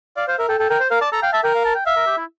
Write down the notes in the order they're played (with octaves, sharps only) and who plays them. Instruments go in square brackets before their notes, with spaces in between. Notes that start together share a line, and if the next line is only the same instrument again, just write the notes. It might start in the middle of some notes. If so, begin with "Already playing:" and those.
[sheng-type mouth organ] D5 [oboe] F5
[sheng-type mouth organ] C5 [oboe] F5
[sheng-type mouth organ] A#4 [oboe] E5
[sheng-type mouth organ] A4 [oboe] G5
[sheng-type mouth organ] A4 [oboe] G5
[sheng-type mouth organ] A#4 [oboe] G5
[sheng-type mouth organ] C5
[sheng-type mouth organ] A#4 [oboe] F5
[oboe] D5 [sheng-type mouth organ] A5
[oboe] A4 [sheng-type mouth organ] A#5
[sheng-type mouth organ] F5 [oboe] G5
[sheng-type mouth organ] E5 [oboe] A5
[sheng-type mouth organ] A#4 [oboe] G5
[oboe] F5
A5
G5
[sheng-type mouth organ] E5 [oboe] F5
[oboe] A#4
G4
E4